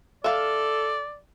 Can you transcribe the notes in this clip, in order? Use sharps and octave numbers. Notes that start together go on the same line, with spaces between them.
A4 D5 E5 F5